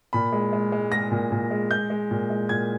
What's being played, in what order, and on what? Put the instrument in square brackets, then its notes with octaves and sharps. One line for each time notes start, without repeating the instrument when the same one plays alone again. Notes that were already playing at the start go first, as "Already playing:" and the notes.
[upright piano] A#2 B5
G#3
G#3
G#3
G#3 A#6
A#2
A#2
G#3
G#3 G6
G#3
A#2
G#3
A#2 G#6